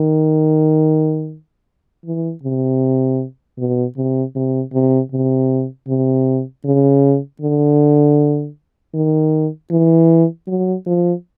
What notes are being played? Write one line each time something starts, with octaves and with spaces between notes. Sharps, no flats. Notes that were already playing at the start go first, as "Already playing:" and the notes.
Already playing: D#3
E3
C3
B2
C3
C3
C3
C3
C3
C#3
D3
D#3
E3
F#3
F3